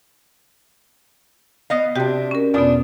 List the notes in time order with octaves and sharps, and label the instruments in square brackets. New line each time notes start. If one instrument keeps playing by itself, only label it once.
[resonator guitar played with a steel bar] B3 D#5 F5
[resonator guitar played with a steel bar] C3 D4 [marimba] F#4 G4 G5
[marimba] C#4 A#4
[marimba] E2 B2 B3 [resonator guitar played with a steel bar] D4 F4